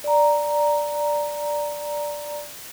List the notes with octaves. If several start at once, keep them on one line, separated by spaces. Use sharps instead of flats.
D5 A#5